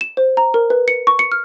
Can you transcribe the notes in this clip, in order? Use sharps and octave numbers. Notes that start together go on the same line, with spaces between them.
E7
C5
A#5
A#4
B4
C#7
C#6
C#7
F6